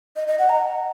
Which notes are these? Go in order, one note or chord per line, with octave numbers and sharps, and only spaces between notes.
D#5
D#5
F#5
A#5